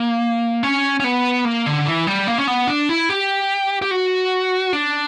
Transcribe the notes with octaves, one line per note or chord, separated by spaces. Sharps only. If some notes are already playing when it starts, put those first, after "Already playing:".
Already playing: A#3
C#4
C#4
B3
A#3
D3
E3
G3
A#3
C#4
B3
D4
E4
G4
G4
F#4
D4